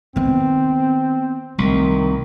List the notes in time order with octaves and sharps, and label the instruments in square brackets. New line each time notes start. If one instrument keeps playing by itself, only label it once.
[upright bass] D#3 B3 [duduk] C4
[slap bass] C2 [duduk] D#3 [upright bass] A3